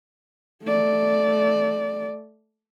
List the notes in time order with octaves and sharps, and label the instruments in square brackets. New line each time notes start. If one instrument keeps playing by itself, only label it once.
[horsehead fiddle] A3 D5